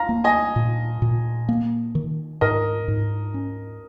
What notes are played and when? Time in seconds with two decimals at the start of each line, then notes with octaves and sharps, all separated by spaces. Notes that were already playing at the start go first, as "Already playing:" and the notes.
Already playing: F5 A#5
0.09 A#3
0.24 D#5 G#5
0.56 A#2
1.02 A#2
1.49 A#3
1.95 D#3
2.41 G#2 A#4 D#5
2.88 G#2
3.34 C#4